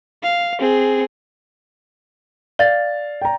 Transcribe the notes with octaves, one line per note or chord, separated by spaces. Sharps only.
F5
C4 G#4
D5 F5 A6
G5 A#5